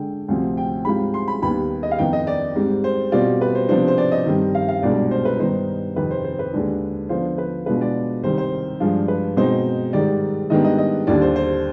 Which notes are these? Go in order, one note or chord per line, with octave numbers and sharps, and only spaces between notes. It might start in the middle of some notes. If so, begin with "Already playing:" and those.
Already playing: D3 G#3 D4 G5
D2 C3 F3 C4
G5
G#2 G3 C4 F4 B5
C6
B5
D#2 D#3 G3 B3 B5
D#5
F5
F2 D#3 B3 D#4 G5
D#5
D5
G#2 G3 C4
C5
B2 G3 C4 F4 D5
B4
C5
C3 F3 B3 D4 C5
C5
D5
D#5
G2 D#3 G3 C4
F5
F5
C2 B2 G#3 D4 D5
C5
B4
G2 D#3 B3 D#4 C5
F2 C3 D#3 B4
C5
C5
B4
D#2 D3 G#3 D4
D3 F3 B3 F4 C5
B4
B2 G#3 B3 D4 F4 B4
D5
C2 C3 D#3 C5
C5
G2 F3 G#3 D4 F4
B4
B2 G#3 C4 D#4 C5
G#2 D#3 G3 D5
G#2 D#3 G3 B3 D4 D#5
D#5
D#5
D#2 D3 G3 D4 D5
C5
C5